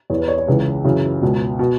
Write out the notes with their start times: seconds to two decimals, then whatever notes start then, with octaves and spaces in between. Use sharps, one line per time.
0.10 E2 E3 C#5
0.19 B4
0.28 C#5
0.38 C#5
0.47 C#2 C#3 E3 B4
0.85 F#2 C#3 E3
1.22 C#2 B2
1.59 B2